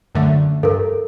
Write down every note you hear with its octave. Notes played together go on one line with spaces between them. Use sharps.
F#2 D3 A3
G2 A4 A#4